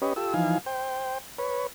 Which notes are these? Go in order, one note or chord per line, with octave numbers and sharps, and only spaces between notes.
C#4 G4 B4 C#5 D#5
F4 G4 A4 E6
E3 F3 D#4 F5 G#5
C5 G5
B4 C#5